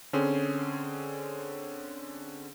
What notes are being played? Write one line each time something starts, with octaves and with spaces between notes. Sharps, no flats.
D3 C4 C#4 G#4 C5